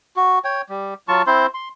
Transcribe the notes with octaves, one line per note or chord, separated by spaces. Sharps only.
F#4
C#5 G5
G3
F#3 F4 A5 C#6
C4 E4 C5 C6
C6